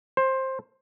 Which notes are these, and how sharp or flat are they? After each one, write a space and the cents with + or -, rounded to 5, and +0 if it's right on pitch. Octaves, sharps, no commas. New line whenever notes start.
C5 +15